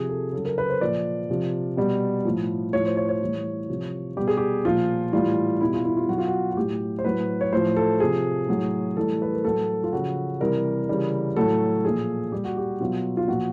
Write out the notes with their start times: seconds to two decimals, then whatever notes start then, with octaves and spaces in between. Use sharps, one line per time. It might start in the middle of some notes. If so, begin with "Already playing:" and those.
Already playing: C3 F3 G#4
0.10 A4
0.33 C#3 A4
0.37 F#3
0.45 A#4
0.58 B4
0.70 C5
0.81 A#2 F3 D5
1.30 C3 F3
1.77 B2 G3
2.25 A2 F3
2.73 A2 F3 C#5
2.86 C5
2.97 C#5
3.09 C#5
3.21 A2 E3 G3
3.69 C3 F3
4.17 B2 G3 G4
4.28 G#4
4.37 G4
4.65 A#2 F3 F4
5.13 A2 E3 G3 F4
5.61 B2 G3 E4
5.73 F4
5.85 E4
5.97 F4
6.09 B2 F#3 F#4
6.18 F4
6.27 F#4
6.51 F#4
6.57 A2 F#3 G4
6.99 C5
7.05 A2 F#3 B4
7.41 C#5
7.52 A2 F3 C5
7.77 A4
8.00 C3 F3 G#4
8.48 A2 F#3
8.97 A2 E3 G3 A4
9.22 B4
9.33 A#4
9.45 A2 F#3 A4
9.84 F4
9.93 C#3 F3 F#4
10.40 C3 E3 G3 A#4
10.89 C#3 E3 G3
11.37 A2 F#3 A4
11.84 A#2 F3 G#4
12.32 A#2 G3 G4
12.45 F#4
12.57 G4
12.80 B2 F#3 F4
13.17 F4
13.28 A#2 F3 F#4